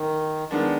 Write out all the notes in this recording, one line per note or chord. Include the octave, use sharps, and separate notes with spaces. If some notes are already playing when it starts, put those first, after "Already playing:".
Already playing: D#3
D#3 G#3 B3 D4